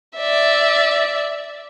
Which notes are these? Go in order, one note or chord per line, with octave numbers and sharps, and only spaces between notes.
D5 E5